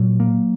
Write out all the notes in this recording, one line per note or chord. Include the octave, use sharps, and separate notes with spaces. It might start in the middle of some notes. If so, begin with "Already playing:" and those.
Already playing: A#2 F#3
A#3